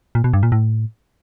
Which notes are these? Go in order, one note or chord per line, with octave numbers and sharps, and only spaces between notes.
A#2
B2
G2
A#2
A2